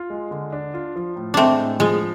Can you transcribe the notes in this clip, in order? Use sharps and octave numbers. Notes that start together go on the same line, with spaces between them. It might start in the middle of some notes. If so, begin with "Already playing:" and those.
Already playing: F4
G#3
D3
D4
F4
F3
A2
G#3 A3 C4 D4
A2
F3 G#3